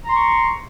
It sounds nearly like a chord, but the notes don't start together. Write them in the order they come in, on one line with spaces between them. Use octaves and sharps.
A#5 C6 C#6